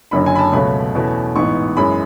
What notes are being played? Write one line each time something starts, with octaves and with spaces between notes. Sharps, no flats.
F#1 F#2 D3 F#3 B5
G#5
B5
A5
C#2 B2 F#3 A3 C#4 B5
E2 B2 A3 C#4
A1 G#2 E3 B3 C#6
F#2 E3 G#3 C#4 B5